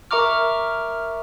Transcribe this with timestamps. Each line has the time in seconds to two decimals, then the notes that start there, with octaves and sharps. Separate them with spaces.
0.11 A#4 E5 A#5 C#6 D6 F6